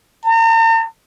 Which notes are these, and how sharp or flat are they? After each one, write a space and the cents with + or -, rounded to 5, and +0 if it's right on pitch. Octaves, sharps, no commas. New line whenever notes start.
A#5 -45